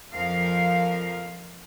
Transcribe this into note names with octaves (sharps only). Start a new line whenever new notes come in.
F2 F3 A#4 F5